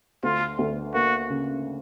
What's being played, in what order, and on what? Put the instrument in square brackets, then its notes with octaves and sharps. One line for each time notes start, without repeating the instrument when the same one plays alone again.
[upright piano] D2 [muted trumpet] F4
[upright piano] D2
[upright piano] A#3 [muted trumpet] F#4
[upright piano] C#3